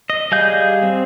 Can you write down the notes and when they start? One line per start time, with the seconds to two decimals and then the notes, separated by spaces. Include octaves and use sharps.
0.10 D#5
0.32 G3 G#4 D#5 F5 G6
0.83 C4